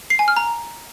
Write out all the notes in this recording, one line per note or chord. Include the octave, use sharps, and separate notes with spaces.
C7
G#5
F6
A#5